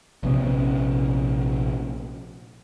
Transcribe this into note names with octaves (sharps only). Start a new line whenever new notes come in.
A#1 C3 B3 C#4